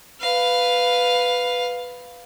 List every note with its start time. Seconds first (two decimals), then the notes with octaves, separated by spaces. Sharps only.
0.21 B4 F5